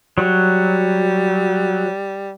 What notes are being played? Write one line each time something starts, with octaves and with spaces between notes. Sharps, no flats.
F#3 G3